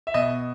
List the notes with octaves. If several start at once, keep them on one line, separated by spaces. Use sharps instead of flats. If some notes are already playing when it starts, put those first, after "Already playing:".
E5
B2 D#5